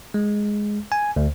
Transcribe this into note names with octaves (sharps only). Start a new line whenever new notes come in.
G#3
G#5
D2